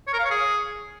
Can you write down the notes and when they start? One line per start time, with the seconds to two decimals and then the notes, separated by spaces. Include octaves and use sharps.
0.07 C#5
0.13 A#4
0.19 F5
0.25 C#5
0.30 G#4